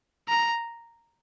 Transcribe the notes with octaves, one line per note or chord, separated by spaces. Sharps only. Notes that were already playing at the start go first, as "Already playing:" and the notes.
A#5